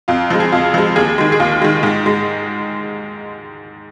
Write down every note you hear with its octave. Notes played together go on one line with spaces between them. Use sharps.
F2 F4
F3 G#3
G#4
F2 F4
F3 G#3
D#2 G#4
D#3 G#3
G#4
D#2 F4
D#3 G#3
G#2
G#3